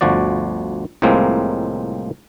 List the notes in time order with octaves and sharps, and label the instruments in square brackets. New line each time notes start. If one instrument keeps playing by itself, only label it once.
[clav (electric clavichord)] G1 D2 F3 F#4 D5
C2 A2 F3 G#3 A#3 C4